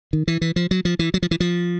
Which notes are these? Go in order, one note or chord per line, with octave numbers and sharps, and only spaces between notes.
D#3
E3
E3
F3
F#3
F3
E3
F#3
F3
E3
F3